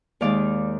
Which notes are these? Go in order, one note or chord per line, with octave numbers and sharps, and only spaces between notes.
D#2 D#3 G#3 D5 F5